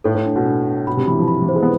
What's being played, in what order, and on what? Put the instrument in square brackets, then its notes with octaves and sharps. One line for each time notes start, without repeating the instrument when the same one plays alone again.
[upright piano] A2 [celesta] A4
[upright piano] A2
[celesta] D4
[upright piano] B2
[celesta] D4
D4
[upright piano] B2 [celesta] B5
[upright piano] C3
[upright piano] E3 [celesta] B5
[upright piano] F3
[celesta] B5
[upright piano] E3
[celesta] C5
[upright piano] G#3
B3